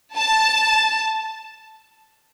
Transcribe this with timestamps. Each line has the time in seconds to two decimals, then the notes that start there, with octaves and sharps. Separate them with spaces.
0.16 A5